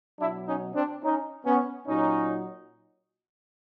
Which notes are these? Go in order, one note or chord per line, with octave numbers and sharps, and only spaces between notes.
B2 F#3 D4 E4
C#4 D#4
C4 D4
C#4 D#4
B3 C#4
A#2 F#3 C#4 D#4